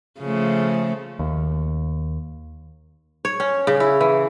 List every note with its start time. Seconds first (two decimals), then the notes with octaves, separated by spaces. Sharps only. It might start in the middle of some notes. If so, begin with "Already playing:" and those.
0.20 C#3 F3 A3
1.19 D#2
3.25 C#5
3.40 C#4
3.67 C#3
3.80 E4
4.01 E3